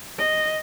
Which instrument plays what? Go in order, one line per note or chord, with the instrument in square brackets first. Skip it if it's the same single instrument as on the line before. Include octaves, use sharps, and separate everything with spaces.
[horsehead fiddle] D#5